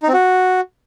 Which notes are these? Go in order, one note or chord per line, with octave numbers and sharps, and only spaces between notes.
D#4
C4
F#4